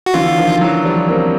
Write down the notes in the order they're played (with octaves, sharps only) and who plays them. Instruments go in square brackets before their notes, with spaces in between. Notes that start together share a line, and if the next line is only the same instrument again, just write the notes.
[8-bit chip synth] F#4
[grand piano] D3 E3 [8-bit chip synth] F4
[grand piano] D#3 F3
E3 F#3
F3 G3
A#3 C4